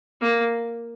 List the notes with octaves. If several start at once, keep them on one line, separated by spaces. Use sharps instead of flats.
A#3